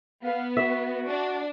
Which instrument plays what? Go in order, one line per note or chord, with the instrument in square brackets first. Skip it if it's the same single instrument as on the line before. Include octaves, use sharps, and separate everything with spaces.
[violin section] B3 [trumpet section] F5
[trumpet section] F#4 [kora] E5
[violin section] D4